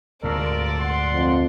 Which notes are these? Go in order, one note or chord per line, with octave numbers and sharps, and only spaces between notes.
D2 G#2 F4 A4 A#4 D5
F#5 C6
F2